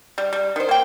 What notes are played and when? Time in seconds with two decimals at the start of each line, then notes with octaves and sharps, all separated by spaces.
0.18 G3
0.33 G3
0.56 D#3 C5
0.69 A#3 G5